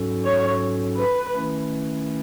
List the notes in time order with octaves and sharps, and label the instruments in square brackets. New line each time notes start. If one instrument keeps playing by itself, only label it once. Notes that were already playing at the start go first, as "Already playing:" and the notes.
Already playing: [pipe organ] G#2 F#3 C#4 F#4 A4
[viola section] C#5
B4
[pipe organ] D#3 A3 C#4 E4 B4